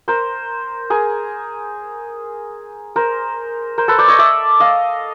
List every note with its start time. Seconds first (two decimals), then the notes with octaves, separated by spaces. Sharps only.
0.08 A#4 C5
0.90 G#4 A#4
2.96 A#4 C5
3.78 A#4 C5
3.88 A4 B4
3.98 C5 D5
4.08 C#5 D#5
4.19 D5 E5
4.60 D#5 F5